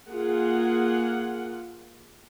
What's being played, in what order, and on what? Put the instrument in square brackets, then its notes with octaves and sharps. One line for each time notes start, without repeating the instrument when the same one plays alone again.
[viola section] A#3 F4 G#4 F#5